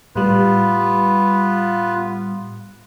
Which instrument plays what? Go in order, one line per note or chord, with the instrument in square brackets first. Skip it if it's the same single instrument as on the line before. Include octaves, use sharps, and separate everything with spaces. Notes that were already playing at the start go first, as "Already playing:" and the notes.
[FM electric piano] A2 G3 [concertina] B3 F4 B4